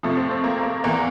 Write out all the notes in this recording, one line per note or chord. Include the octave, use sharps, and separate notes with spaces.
F2 C3 F3 A3
C4
C4
A#3
A#3
E2 E3 A#3